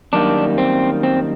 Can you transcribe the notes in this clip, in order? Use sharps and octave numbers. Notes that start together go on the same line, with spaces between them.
F#2 D#3 G3 A#3 D4
C4
C4